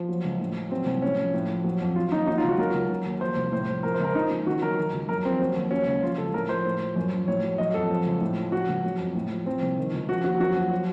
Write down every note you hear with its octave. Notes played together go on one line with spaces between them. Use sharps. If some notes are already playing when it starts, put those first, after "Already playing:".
Already playing: F3
F#3
C#2
A2
F3
F#3 C4
C2
A2 C#4
F3
A2
F3
F#3
F2
F#3 F4
D#2 D#4
F#3 D#4
F4
C#2 F#4
F#3 A#4
C#2
F#3
D#2
F3 C5
C2
A2 C5
F3
F3 A#4
C5
C#2 A#4
F3 D#4
C#2
D#3 F#4
F#3 A#4
D#3
C#2
F#2 A#4
F3 C4
F#3
D#2
F#3 C#4
C#2
F3 F4
C#2 A4
A2 A#4
F3 C5
A2
F3
F#2
F3
A2 C#5
F#3
F#3 D#5
F2 A4
F3
C#2
A2
F3
F3 F#4
C#2
F#3
F2
A2
F3
F3 C4
C2
D#3
C#2
F3 F#4
D#2 F#4
F#2 F#4
F3
F#3